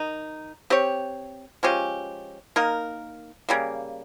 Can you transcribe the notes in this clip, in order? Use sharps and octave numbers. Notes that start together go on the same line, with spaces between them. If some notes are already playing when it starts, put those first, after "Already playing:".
Already playing: D#3 D#4
C4 G4 C#5
F3 G#3 C#4 G4
A#3 D#4 A#4
C#3 G3 A#3